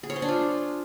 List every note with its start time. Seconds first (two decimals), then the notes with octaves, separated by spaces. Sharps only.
0.03 G#4
0.10 C#5
0.16 C5
0.22 D4
0.28 F4